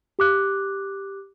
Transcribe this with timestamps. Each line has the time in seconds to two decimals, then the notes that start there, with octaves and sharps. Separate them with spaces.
0.19 G4 D6 F#6